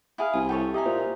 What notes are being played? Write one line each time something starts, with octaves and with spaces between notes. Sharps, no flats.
E4 G#4 F5
C2 G#5
G4 A4 C#5
G4 D#5 E5 G#5 A#5
A#2 C5